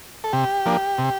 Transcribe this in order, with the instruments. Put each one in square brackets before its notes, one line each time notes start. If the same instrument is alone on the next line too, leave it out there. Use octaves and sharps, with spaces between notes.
[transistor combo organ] A4
C3 G4
F3 A#3 D4
C3